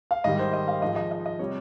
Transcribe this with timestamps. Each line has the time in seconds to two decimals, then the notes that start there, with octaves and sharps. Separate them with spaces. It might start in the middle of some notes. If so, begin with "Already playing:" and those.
0.11 F5
0.24 G#2 D#3 G3 D#5
0.39 C5
0.53 D#5
0.68 F5
0.82 G#2 F3 G#3 D#5
0.96 D#5
1.11 D#5
1.26 D#5
1.39 C3 G3 C#5